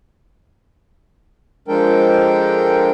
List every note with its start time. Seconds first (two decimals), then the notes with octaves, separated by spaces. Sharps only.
1.68 F3 G#3 D4 A4 A#4 G5